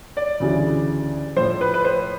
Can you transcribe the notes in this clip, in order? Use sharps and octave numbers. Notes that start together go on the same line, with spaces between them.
D5
D2 C#3 E3 G3
A2 F3 C5
B4
B4
C5